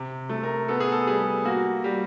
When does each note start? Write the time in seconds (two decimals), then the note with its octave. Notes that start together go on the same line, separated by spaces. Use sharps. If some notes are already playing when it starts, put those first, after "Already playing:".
Already playing: C3
0.29 A3
0.43 A#4
0.68 B3 A4
0.80 G#4
0.92 A4
1.07 G3 G#4
1.45 A#3 F#4
1.84 G3